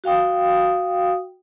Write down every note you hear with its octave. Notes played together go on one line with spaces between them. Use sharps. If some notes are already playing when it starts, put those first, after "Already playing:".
F#4 F5 G5 D#6